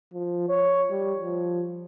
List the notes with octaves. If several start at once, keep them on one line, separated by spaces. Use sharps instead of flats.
F3
C#5
G3
F3